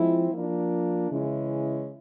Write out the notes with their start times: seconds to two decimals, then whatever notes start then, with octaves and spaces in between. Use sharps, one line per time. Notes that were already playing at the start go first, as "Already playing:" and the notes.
Already playing: F3 G#3 C4 E4
0.31 F3 A#3 D4
1.11 C#3 E3 G#3 C#4 E4